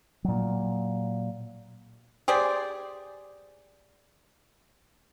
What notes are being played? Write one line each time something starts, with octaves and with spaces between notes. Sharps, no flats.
A#2 F#3
G4 G#4 C5 D5